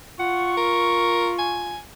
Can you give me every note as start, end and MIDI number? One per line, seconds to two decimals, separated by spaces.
0.19 1.78 65
0.19 0.57 78
0.19 1.62 85
0.57 1.32 70
1.39 1.79 80